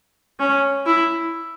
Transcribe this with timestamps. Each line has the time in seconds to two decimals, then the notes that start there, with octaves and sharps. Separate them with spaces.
0.40 C#4
0.86 E4